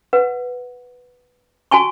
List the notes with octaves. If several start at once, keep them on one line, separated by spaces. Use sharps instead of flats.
B4 F#5
F#4 G#5 A5 C#6